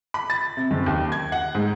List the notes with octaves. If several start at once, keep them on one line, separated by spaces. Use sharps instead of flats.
B5
A6
C3
F#1
D#2
G#6
F#5
G#2